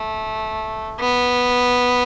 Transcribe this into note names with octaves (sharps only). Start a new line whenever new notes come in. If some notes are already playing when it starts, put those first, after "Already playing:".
Already playing: A3
B3